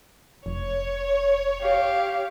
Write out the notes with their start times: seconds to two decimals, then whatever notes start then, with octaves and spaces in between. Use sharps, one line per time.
0.46 F1 C#5
1.62 G4 F5